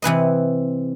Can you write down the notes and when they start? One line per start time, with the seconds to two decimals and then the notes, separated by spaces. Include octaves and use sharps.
0.02 C3 E3 B4 D#5